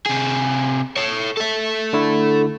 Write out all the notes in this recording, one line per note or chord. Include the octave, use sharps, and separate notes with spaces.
C3 G#4
A4 C#5
A4 E5
D3 A3 E4